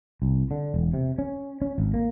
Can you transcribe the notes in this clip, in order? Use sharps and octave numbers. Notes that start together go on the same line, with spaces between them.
C2
D3
E1
C3
C#4
C#4
G#1
A#3